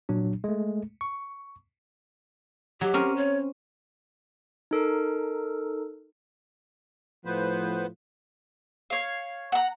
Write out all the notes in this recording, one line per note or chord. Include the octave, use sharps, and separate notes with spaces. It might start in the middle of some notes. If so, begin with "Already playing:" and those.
A#2 F#3 D4
G#3 A3
C#6
F#3 G4
C4 C#4 A#4
C#5
D#4 A4 A#4
A2 F3 B3 B4 C5
C#5 F5
F#5 A#5